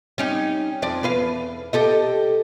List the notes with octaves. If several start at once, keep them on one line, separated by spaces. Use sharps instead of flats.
G3 C#4 D#4
F2 F3 D5
E2 B4 F5
G4 A4 D#5